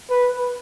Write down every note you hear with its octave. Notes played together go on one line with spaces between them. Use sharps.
B4